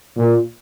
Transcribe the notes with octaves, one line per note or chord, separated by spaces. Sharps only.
A#2